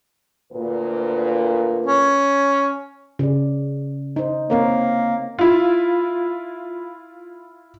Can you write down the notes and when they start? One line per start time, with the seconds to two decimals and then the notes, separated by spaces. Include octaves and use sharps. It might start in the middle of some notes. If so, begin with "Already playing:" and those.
0.52 D2 A#2 B4
1.86 C#4
3.19 C#3 D5
4.16 D#4 C5
4.50 A#3 C4 A#4 C#5
5.39 E4 F4